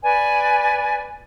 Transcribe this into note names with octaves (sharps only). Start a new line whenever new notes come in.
B4 D5 G#5